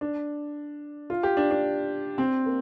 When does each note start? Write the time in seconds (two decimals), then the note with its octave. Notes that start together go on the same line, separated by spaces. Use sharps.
0.01 D4
1.10 F4
1.23 G4
1.37 D4
1.51 D4
2.18 C4
2.46 A#3